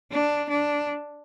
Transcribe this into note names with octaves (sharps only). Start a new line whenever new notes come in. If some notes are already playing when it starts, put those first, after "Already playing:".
D4
D4